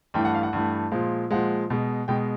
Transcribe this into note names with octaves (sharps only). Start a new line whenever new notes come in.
G2 E3 A3 G5
F#5
F5
F#5
G2 E3 A3
A#2 F3 G#3
A#2 F3 G#3 F#5
B2 G#3
B2 G#3 G5